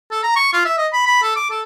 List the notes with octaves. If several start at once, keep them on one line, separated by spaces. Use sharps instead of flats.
A4
A#5
C#6
F4
E5
D#5
B5
B5
A4
D6
A4